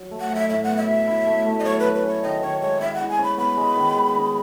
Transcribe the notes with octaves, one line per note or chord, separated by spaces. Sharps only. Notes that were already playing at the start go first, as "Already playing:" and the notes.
Already playing: F#3
A3
F#5
F#3 E5
A2 E5
B3 F#5
E5
F#3
E4
A3
A3
D#5
F#3 C#5
B4
F#3
B4
C#4 C#5
D#3 D#5
D#3 C#5
G#3 C#5
E4 E5
E4 F#5
G#5
C#4 B5
B3 B5
G#3
D#3
G#3
D#4